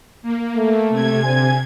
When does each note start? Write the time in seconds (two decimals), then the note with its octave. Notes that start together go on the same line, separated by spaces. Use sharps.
0.23 A#3
0.57 A3
0.90 C3 G#6
1.24 D3 C5 G#5